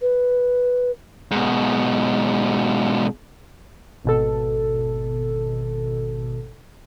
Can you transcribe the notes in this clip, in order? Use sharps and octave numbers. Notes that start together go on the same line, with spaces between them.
B4
G#2 B2
G#1 B2 A4